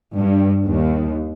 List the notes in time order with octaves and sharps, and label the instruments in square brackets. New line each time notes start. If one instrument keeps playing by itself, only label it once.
[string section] G2
D#2